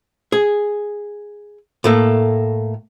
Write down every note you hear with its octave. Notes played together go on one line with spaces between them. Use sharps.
G#4
A2 A3 A#3